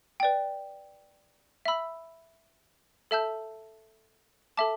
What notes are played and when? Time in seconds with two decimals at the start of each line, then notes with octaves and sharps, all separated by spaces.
0.20 B4 D5 G5
1.65 E5 B5 E6
3.11 A4 E5 A5 E6 G6
4.57 A4 E5 A5 D6